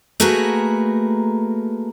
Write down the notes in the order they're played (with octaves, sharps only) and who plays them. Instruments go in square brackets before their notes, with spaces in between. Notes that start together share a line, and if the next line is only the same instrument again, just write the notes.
[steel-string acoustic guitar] A3 A#3 F#4 G#4 A#4 B4